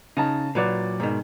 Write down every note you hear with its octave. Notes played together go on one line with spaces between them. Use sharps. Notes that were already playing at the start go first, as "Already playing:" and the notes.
C#3 D#4 A5
A#2 F#3 B4 D5
G#2 B2 D#3